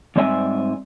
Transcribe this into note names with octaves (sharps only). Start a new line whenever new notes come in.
G#2 G3 C4 D5 E5 G#5